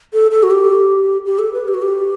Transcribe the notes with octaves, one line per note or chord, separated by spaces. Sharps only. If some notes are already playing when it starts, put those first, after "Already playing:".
A4
A4
F#4
G4
G4
A4
B4
G4
F#4
G4